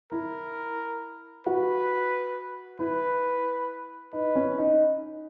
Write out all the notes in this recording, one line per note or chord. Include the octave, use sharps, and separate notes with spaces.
E4 A#4
F#4 B4
E4 B4
D#4 B4
C#4
D#4